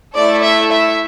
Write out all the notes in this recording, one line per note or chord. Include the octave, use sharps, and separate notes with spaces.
A3 E4 A4 D5
E5
E5